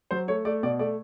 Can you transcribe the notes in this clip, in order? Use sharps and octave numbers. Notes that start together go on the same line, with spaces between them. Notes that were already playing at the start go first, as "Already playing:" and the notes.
F#3 C5
A3 C#5
A3 D5
B2 D5
A3 D5